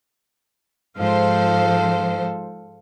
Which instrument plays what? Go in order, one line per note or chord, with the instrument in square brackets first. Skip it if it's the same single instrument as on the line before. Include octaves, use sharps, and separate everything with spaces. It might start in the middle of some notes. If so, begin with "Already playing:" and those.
[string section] G#2 F3 C5 [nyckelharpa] A4 F5